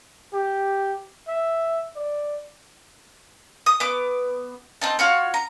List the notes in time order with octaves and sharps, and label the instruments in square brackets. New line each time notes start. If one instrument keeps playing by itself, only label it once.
[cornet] G4
E5
D5
[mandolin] D#6
B3 D6
C4 D#4 A5
F4 F#4 C#5
A#5